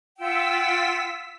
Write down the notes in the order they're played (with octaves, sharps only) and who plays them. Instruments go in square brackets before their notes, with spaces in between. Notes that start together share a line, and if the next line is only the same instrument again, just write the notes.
[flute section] F4 F#5 G5 [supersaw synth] E6 B6